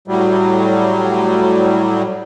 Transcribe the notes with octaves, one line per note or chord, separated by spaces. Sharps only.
A2 F#3 G3